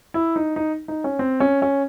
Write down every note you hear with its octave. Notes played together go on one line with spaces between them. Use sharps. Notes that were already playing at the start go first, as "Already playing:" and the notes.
E4
D#4
D#4
D#4
C#4
C4
C#4
C#4